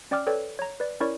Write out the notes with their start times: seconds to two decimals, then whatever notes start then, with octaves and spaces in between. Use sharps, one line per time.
0.11 C#4 D5 G5 D6 F6
0.27 A4 B4 C#5 D5 G5
0.59 C#5 A#5
0.80 B4 D5
1.00 C#4 E4 A#4 C#5 D5 C#6